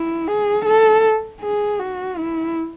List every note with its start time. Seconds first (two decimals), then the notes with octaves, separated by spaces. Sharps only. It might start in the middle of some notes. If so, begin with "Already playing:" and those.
Already playing: E4
0.28 G#4
0.65 A4
1.41 G#4
1.80 F#4
2.18 E4